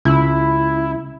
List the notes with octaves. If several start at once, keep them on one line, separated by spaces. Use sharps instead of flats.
C#2 E4